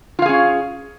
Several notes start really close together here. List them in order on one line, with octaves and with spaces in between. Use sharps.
F4 F5 G#4 C#4